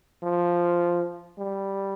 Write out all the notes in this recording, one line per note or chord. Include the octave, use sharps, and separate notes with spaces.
F3
G3